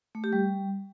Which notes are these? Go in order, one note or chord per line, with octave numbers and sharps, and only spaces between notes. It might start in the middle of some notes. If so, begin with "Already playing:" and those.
A3
G4
G3